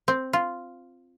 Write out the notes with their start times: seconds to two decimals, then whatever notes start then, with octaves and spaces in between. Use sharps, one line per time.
0.08 C4
0.33 F4